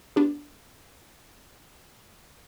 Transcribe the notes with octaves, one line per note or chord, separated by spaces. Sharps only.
B3 D4 G4